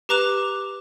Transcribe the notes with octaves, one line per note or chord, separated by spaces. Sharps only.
G4 B4 A#5 D6 F#6 E7